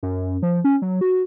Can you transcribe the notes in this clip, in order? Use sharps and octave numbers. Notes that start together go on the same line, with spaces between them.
F#2
F3
C#4
F#3
F#4